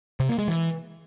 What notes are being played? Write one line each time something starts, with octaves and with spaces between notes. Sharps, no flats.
C3
A#3
G#3
E3